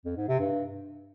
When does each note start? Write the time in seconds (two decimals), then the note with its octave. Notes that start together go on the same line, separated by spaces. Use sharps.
0.05 F2
0.17 G#2
0.28 C3
0.40 G2